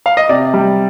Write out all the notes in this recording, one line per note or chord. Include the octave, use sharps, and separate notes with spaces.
F5
D#5
C3 D5
G3